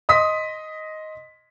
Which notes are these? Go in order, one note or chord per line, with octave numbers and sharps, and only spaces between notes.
D#5 C6 D#6 B6